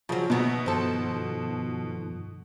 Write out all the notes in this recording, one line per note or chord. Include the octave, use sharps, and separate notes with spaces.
C#3 F3 F#3
B2 D#3 B3 E5
G2 D#3 F3 A4 C5